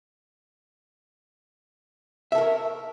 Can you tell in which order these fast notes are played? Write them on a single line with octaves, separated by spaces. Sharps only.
E5 A4 A#4 C#5